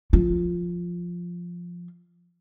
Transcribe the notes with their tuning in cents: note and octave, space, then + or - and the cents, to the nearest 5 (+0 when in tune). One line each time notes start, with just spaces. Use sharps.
F3 +0 F4 +0